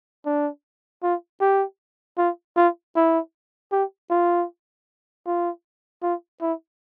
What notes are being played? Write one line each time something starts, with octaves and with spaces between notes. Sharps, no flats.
D4
F4
G4
F4
F4
E4
G4
F4
F4
F4
E4